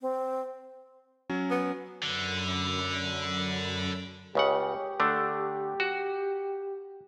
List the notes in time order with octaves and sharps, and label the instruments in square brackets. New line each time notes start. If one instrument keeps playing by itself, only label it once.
[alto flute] C4
[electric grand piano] F#3 C#4
[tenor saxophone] B3
[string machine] F#2 B5 [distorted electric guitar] D3
[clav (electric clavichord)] C#2 C#3 F#5 [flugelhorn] G4
[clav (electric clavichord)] D3 A3 D4
F#4